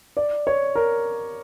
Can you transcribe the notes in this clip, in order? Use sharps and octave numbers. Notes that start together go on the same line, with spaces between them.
D5
C#5
A#4